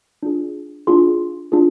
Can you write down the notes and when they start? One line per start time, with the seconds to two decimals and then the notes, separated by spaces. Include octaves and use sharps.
0.23 D4 F4 G#4
0.87 D4 F4 G#4 C6
1.52 D4 F4 G#4